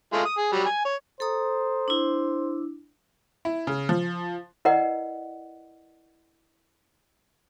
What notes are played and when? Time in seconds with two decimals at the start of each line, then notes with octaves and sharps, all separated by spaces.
0.13 G#3 A3 F4
0.25 D#6
0.38 G#4
0.52 F#3 G3
0.66 G#5
0.85 C#5
1.20 A4 C5 A#5 D#6
1.88 D4 E4
3.45 E4
3.67 C#3
3.89 F3
4.65 E4 A#4 B4 D5 D#5 F#5